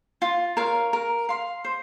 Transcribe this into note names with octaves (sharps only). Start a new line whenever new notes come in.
F4
A#4 C#5 F5
A#4
F5 C6
C5